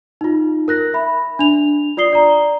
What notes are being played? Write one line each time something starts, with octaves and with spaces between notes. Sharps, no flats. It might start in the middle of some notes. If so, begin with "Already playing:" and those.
D#4 F4
A#4 F#6 A#6
E5 B5
D4 F7
F4 D5 D#6 C7 G7
D5 A#5